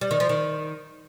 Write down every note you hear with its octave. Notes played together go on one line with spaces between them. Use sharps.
G3
D#3
F3
D#3